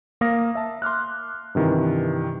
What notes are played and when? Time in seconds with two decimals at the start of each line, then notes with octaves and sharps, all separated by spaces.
0.21 A#3 F5 D#6 A#6
0.55 E5 A5
0.82 C6 D6 F6 F#6
1.55 G2 C3 D#3 E3